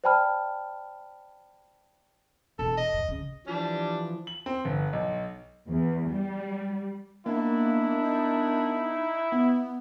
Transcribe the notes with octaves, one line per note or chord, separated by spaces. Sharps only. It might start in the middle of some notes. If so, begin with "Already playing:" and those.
C5 D5 G5 A5 B5 F6
E1 A4
D#5
F2 A2
C#3
E3 F3 G3 D4
F#7
C4
G1
B1
E2
G3
D#3 A#3 B3 D4 E4
D#4
B3